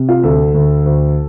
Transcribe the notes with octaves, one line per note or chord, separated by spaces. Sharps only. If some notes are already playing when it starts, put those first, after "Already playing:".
Already playing: C3
F4
D2 A4
D2
D2